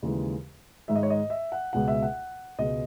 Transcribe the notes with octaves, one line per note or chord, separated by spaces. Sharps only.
D#2 C#3 E3 G#3
G#2 D#3 G#3 E5
D#5
C#5
D#5
E5
F#5
C#2 B2 G#3 F#5
E5
F#5
C#2 B2 G#3 D#5